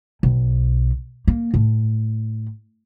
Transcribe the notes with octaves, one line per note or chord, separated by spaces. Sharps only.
B1
A#3
A2